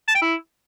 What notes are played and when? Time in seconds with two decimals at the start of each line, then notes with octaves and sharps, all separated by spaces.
0.08 A5
0.15 G5
0.22 E4